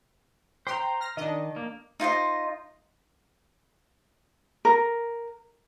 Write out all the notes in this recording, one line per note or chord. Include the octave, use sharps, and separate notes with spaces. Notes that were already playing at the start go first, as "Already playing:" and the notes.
C5 G5 A#5 C6
F6 A#6
D#3 D4 D#5
A#3
D#4 F4 C5 D#5
A#4